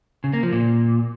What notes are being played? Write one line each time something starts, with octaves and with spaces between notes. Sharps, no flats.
C#3
A#3
F3
A#2